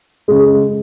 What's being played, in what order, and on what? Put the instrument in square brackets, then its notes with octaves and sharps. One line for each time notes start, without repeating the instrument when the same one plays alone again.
[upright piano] C#3 G#3